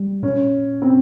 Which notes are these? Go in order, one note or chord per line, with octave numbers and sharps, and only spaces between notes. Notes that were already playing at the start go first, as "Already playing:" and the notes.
Already playing: G3
A#2 C#4
C4